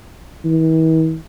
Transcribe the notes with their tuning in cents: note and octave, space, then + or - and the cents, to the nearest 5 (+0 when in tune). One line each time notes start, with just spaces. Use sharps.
E3 -45